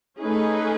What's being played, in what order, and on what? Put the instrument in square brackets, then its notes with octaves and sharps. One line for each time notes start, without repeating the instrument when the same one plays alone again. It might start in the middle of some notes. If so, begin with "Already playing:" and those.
[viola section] A3 C#4 G#4 B4 [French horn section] D#4